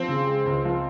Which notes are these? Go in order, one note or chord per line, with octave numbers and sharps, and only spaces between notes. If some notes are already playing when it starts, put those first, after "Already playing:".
Already playing: F3 C4
C#3
G#3
C#2
F3